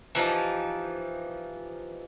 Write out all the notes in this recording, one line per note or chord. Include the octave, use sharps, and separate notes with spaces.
E3 F3 D#4 G4